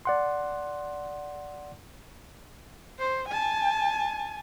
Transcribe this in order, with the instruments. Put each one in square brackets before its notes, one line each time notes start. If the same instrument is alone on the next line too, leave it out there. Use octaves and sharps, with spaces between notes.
[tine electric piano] D5 F#5 C6
[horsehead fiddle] C5
G#5 A5